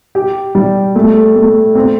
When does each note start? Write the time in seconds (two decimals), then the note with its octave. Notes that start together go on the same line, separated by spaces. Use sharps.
0.15 G4
0.55 G3
0.95 A3
1.35 A3
1.75 C4